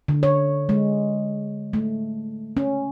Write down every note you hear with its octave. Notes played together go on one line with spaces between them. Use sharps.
D3
C#5
G#3
A3
C#4